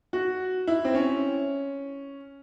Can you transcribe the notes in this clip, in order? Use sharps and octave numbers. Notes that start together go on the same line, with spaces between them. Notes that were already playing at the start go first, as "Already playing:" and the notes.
F#4
E4
C4
C#4